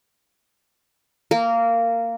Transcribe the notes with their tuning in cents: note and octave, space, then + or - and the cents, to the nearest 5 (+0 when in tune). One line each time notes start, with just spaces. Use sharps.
A#3 -15 A#4 -20